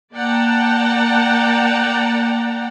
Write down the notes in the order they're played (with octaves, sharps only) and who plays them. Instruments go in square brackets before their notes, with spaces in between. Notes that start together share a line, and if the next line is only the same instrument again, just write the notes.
[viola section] A#3 D5 F#5 G5 A5 A#5